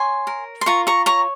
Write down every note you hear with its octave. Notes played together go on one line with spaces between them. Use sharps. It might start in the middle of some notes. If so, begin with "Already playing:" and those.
Already playing: C#5 G#5 C6
A#4
C6
F4 A#5 C#6
A#5 C#6
C#5 A#5 C#6